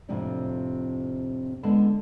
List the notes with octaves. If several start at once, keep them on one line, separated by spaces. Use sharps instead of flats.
F2 A2 C3 F3 C4 D4
D3 G#3 B3 A5